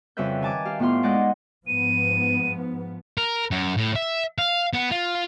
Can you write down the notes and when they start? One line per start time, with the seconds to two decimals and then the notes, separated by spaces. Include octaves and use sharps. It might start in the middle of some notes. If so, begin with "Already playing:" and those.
0.17 F2 C#3 G3 B4 E5 G6
0.41 D#3 G#5 A5 D6
0.65 G4 F5
0.79 A2 B3 F4 F5 C6
1.03 G#3 D5 D#5 F#5 G6
1.14 D#4
1.67 G#2 F3 B3 D#7
3.18 A#4
3.51 F#2
3.77 A2
3.96 E5
4.38 F5
4.73 B3
4.91 F4